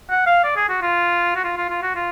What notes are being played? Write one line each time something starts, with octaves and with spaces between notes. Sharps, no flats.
F#5
F5
D5
G#4
F#4
F4
F#4
F4
F4
F4
F#4
F4